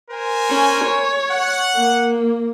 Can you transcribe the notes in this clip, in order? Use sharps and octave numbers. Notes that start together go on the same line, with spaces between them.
A#4 C5 G#5
C#4
C#5
F#5
A#3